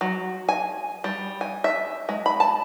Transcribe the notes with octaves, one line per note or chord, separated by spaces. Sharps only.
F#3
G#5
G3
G#5
E5
G#3
B5
A5